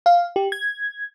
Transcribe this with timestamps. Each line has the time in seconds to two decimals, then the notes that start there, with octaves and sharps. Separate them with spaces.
0.06 F5
0.36 G4
0.52 G#6